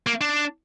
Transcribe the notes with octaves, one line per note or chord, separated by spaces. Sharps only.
A#3
D4